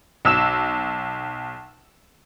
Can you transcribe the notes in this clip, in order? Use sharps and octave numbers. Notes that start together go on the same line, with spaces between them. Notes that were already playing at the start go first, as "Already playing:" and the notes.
B1 E6 E7